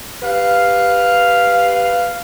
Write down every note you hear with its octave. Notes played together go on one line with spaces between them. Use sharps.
G4 B4 F5